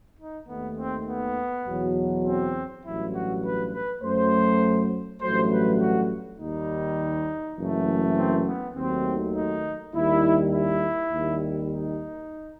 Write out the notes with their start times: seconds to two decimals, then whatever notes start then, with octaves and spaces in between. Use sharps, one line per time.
0.18 D#4
0.47 D#2 D#3 A3 B3
0.77 C4
1.06 B3
1.66 E2 B2 F#3
2.25 C4
2.84 A1 G2 F#3 E4
3.13 F#4
3.43 B4
3.73 B4
4.02 F#2 F#3 A3 C5
5.20 A1 G2 F#3 A3 C5
5.50 B4
5.80 F#4
6.38 D#2 D#3 G3 D#4
7.57 F#1 F#2 E3 A3
8.16 C4
8.46 B3
8.75 D#2 D#3 F#3 A3 C4
9.34 D#4
9.93 D#2 D#3 G3 E4
10.52 E4
11.11 D#2 D#3 G3
11.71 D#4